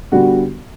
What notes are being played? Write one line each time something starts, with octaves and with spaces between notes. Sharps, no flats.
D3 G3 B3 F#4